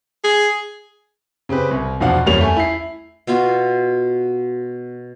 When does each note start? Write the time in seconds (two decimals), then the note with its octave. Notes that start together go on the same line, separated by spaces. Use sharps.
0.24 G#4
1.49 C#3 C4 G4 B4
1.71 C2
2.00 E2 B2 F3 D4 F5 F#5
2.26 F#1 E2 G3 A#3 C#5 F7
2.41 A3 G#5
2.57 E4 C7
3.27 B2 B3 F4 F#4